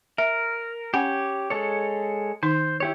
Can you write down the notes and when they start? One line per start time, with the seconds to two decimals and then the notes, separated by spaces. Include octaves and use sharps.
0.18 A#4 E5
0.94 C#4 G4 C#5 F#5 G#5
1.50 G#3 A4 C#5
2.43 D#3 D#4 C5
2.80 E4 G4 C#5